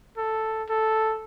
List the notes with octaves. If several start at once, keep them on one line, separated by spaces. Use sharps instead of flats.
A4
A4